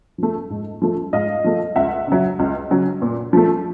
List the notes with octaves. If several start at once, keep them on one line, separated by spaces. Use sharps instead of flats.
F3 A3
G#2
F3 A3
G#2 D#5 F5
F3 A3
C#2 E5 F#5
C#3 F#3
C#2
C#3 F#3
A#2
F3 A3